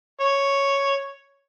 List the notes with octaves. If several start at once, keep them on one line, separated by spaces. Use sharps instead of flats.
C#5